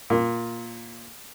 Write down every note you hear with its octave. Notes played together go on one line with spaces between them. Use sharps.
A#2